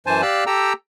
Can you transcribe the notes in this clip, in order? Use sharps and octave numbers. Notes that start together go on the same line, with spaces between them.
F#2 E3 C5 G#5 A5
G4 D5 F5 E6 F#6
G4 A4 G5 A#5 E6